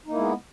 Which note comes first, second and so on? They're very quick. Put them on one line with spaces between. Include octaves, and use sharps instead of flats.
D#4 A#3 E4 G#3 B3